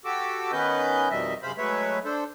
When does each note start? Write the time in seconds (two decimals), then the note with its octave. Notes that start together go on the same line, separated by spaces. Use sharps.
0.05 F#4 G4 A4 D6 E6
0.52 D#3 B3 C#4 B4 D#5 G6
1.10 F2 B2 D#3 G3 D#5 E5
1.43 F#2 C3 G#3 C5 F5 B5
1.58 F#3 G#3 A3 B4 C#5 E5
2.05 D4 A4 C5